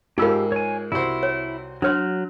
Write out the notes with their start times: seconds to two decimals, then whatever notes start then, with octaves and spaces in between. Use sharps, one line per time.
0.18 G#2 G#3 D#4 F4 G4 A#4 F5 E6
0.52 C#5 G#5
0.92 C2 E4 F#4 C5
1.23 C#5
1.82 F#3 D4 C#5 C6 F6